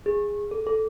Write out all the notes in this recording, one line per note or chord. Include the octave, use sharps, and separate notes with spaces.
G#4
A4
A4